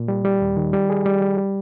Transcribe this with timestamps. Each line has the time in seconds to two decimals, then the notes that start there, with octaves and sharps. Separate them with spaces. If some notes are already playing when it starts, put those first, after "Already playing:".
Already playing: A#2
0.08 G3
0.25 G3
0.41 D#2
0.57 D#3
0.73 G3
0.89 G#4
1.06 G3
1.22 G3
1.37 G3